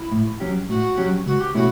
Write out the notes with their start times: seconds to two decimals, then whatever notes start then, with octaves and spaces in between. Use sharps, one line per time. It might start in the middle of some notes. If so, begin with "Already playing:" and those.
Already playing: E4
0.11 A2
0.40 F#3 C#4 G4
0.69 A2 F#4
0.97 F#3 C#4 G4
1.26 C#2 F#4
1.40 G4
1.55 B2 A3 C#4 E4 F#4